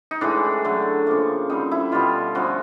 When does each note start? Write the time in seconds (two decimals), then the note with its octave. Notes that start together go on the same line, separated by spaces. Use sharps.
0.11 D#4
0.21 A2 E3 G#3 D4
0.65 D3 F#3 A3
1.07 C#3 F3 A#3
1.50 D3 G3 C4 D#4
1.71 E4
1.92 B2 G3 B3 F4
2.35 D3 F3 A3 C#4 F#4